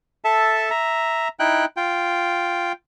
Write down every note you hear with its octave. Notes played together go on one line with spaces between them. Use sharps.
A4 E5 A5
E5 A#5
D#4 E4 G5 F#6
F4 G5